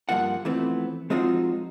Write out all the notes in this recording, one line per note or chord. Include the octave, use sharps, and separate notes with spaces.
G2 E3 F3 A#3 F4 F#5
E3 F3 A3 B3 C4
F3 G#3 C4 D#4 F4 F#4